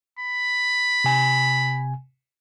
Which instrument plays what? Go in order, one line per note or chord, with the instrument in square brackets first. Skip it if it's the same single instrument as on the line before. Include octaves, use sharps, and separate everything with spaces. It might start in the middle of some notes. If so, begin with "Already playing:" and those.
[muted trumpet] B5
[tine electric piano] C3 G#5